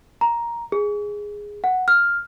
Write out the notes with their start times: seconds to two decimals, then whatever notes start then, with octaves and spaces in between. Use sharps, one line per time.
0.21 A#5
0.72 G#4
1.64 F#5
1.88 F6